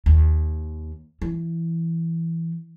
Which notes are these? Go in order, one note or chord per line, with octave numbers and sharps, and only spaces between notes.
D#2
E3